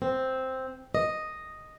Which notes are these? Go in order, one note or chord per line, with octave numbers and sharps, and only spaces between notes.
C4
D#5